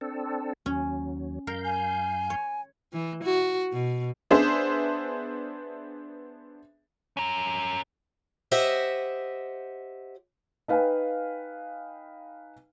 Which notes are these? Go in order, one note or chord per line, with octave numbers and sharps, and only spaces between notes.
C4 D4 A4
D#2 F#3 C#4
F#2 A#4 F5 G6
G#5
C#5
E3
F#4
B2
B3 D4 G#4 C5 E5
C#4 A#4
G4 C5 D#5 E5 F#5
D#4 B4 F5 G5 G#5